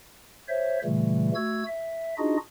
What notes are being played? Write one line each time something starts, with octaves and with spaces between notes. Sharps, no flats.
C5 C#5 E5
A#2 C#3 E3 G3 A3
A3 F#4 E6 G#6
E5
D4 D#4 F4 F#4 G#4 D#5